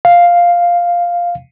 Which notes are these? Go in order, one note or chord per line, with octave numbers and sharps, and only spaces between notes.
F5